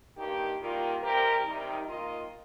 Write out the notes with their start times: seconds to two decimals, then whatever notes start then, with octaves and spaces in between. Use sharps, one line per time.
0.17 G2 D#3 A#3 D#4 G4
0.59 D#3 G3 A#3 F4
1.02 C3 G3 C4 G4 A#4
1.44 C3 D#3 G3 D#4
1.86 D#3 A#3 F4 D#5